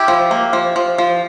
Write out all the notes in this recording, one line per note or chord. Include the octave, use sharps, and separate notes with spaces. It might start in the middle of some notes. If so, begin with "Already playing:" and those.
Already playing: E4 G4
F3
A#3
F3
F3
F3